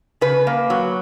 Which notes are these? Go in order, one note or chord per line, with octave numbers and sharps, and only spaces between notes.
C#3 B4
A#3
F#3